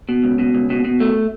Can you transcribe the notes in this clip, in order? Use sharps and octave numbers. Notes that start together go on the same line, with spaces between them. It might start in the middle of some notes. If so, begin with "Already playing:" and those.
B2
C#2
B2
C#2
B2
B2
A3